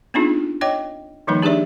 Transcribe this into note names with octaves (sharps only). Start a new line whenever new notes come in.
B3 C4 D4 D#4 F4 G#4
C#5 D#5 G5 D6
D#3 F3 G3 A#3 D#4 B4
D4 G4 G#4 B4 D5 E5